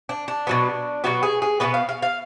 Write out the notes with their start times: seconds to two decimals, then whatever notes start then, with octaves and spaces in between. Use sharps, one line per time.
0.09 D4
0.28 D4
0.47 B2 F#3 B3
1.04 B2 F#3 B3 F#4
1.23 G#4
1.42 G#4
1.60 B2 F#3 B3 B4
1.74 F5
1.89 F5
2.02 F5